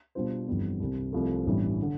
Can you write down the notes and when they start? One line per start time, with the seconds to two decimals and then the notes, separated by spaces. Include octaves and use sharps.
0.15 B2 G3 D4 F4 C5
0.47 G1 F2 E3 G3 B3
0.80 C2 C3 G3
1.13 C2 C3 F3 A3
1.46 A1 G2 E3 G3 B3
1.82 D3